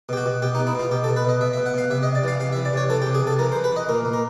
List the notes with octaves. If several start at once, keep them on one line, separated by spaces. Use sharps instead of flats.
B2 G4
F#4
B2
B2 G4
D#4
B2
E4
B2 F4
B2 G4
A4
B2
B4
B2 D#5
B2 E5
E5
B2
F#5
B2 F5
C3 E5
D#5
C3
D5
E3 F5
C3 F5
E5
E3
D5
C3 C#5
E3 A4
G4
C3
G#4
C3 A4
E3 A#4
C5
E3
B4
E3 D#5
A#2 A#4
A#2
A#4